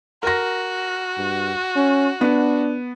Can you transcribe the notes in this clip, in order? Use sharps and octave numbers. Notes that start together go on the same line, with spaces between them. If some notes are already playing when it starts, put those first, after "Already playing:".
F#4 A#4 A#6
G2
C#4
B3 D4